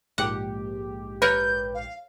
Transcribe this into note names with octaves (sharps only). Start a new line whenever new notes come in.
A#1 G#2 G4 F#5
A#4 B4 C#5 G6
F5